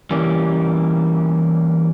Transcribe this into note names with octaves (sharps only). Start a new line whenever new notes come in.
E3 G3 A#3 C#4